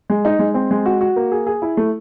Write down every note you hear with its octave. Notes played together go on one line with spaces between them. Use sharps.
G#3
D#4
G#3
C4
G#3
F#4
F#4
A#3
G#4
G#4
E4
A3